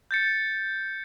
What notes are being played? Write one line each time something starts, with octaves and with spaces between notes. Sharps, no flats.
G6 A6 C#7